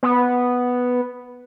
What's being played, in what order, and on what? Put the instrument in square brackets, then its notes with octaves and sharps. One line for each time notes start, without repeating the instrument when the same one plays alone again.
[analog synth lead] B3